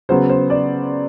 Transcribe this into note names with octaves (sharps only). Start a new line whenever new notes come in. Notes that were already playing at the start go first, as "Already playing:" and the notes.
C#3 F#3 B3 C5
C5
D5